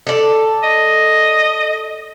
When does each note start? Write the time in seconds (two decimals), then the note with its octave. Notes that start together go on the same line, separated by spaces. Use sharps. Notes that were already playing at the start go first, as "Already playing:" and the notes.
0.07 A4 D5
0.63 D#5